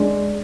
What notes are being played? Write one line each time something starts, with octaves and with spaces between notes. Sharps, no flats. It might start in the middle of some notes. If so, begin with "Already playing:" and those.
Already playing: G#3 D4